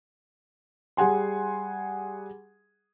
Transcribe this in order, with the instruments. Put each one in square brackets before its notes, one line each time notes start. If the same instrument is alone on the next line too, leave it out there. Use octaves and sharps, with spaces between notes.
[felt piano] G3 G#4 F#5 G#5 C6